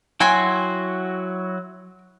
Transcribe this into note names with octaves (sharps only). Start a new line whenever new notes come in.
F#3 E4 F#4 G5 G#5 C6